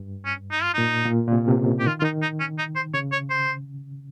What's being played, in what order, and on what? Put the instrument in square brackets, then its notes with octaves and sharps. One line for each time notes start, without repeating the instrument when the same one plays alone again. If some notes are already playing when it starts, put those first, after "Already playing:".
Already playing: [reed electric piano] G2
[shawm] C#4
D#4
F4
[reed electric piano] A#2 [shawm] D#4
[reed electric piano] A#2
A#2
C3
C3
C#3
[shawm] G4
[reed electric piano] D#3 [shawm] F4
[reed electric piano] D#3 [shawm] D#4 F4
[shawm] D#4
C#4
D#4
C5
[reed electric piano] C#3 [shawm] C#5
[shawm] C#5
C5